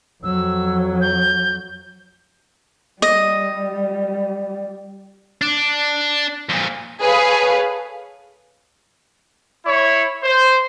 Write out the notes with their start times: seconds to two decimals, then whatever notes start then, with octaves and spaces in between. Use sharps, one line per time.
0.23 F2 F#3 E6
1.01 G6
3.02 G3 D#5
5.42 D4
6.50 F2 A#2
7.01 G#4 A4 B4 C#5 F5
9.65 E4 C#5
10.23 C5